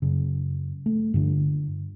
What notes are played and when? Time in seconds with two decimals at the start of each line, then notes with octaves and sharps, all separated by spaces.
0.02 F#2 C#3
0.86 A3
1.14 G2 D3 D4